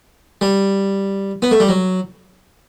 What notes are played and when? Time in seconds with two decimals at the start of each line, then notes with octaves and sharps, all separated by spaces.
0.41 G3
1.42 B3
1.51 A3
1.60 G3
1.69 F#3